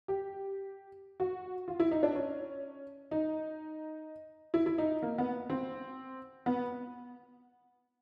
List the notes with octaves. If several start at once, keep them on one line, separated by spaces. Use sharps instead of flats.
G4
F#4
F4
E4
D#4
D4
C#4
D#4
E4
E4
D#4
A#3
B3
C4
B3